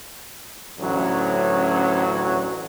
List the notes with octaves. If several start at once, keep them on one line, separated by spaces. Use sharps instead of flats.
A1 D2 F#3 C#4